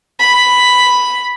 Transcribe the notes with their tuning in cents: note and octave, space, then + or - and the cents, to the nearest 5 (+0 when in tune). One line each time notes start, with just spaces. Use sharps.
B5 +5